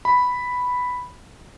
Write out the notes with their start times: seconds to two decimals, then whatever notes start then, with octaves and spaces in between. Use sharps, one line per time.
0.05 B5